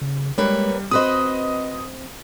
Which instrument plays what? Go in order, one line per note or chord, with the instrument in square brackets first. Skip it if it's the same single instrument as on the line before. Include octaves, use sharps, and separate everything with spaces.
[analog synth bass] C#3
[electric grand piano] G3 [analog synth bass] G#3 [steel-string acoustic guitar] A#3 B4 C#5
[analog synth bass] C4 [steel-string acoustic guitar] F#4 B4 C5 [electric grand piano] D#5 D#6